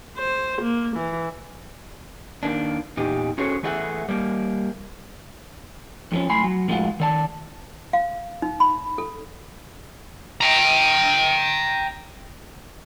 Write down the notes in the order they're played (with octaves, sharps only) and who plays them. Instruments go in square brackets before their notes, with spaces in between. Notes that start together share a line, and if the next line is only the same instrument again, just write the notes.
[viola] C5
A#3
E3
[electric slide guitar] D#3 A#3 D4
E2 A#2 D#4 G4
C#4 F#4 G#4 A4 C5 C#5
E3 A3 G#4 E5 F#5
G3 A#3
[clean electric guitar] F2 F3 C#4
B1 A2 G#5 B5 C6
F#3
A2 F3 G#3 D4 F4 F#4
D#3 D5 A5
[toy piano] F5
D#4
B5
A4
[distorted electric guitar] G5 A#5